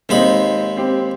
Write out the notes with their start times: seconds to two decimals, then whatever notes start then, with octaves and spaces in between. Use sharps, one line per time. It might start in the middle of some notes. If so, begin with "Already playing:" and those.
0.09 D#2 G#3 C4 D#4 B5
0.77 C4 G4